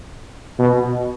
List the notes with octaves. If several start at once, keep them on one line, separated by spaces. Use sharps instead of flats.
B2